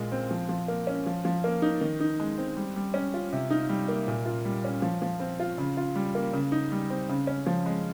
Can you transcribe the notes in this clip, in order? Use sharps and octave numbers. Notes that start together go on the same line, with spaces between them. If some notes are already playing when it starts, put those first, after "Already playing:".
Already playing: A#2 G#3 F4
C4
F3
F3
A#3
C#4
F3
F3
A#3
D#4
D#3
D#4
G#3
C4
G3
G3
C#4
F4
C3
D#4
G3
A#3
A#2
F4
G3
C#4
F3
F3
C4
F4
C#3
F4
G3
A#3
C#3
D#4
G3
C4
C#3
C#4
F3
G#3